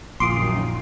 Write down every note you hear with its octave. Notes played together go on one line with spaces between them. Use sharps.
A#1 F#2 A#2 D#3 F4 C6 D6 D#6